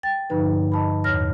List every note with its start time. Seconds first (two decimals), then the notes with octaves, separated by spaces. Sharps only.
0.03 G5 A6
0.30 G2 D3 F3 D#4 B4
0.72 D#5 A5 B5
1.04 E2 A2 C#5 F6 A#6